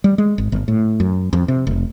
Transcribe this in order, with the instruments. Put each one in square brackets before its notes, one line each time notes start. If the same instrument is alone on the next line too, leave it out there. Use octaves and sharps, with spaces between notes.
[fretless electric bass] G3
G#3
G#1
G1
A2
F#2
F2
C3
F1